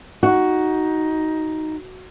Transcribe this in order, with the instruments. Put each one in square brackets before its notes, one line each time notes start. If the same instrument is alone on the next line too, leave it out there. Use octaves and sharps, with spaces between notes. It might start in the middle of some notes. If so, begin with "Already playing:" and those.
[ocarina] D#4 [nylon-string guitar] F#4